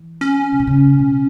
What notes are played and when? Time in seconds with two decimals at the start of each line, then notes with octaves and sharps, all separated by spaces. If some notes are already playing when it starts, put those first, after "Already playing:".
Already playing: E3
0.21 C#4
0.52 C#3
0.60 B2
0.67 C#3
0.99 B2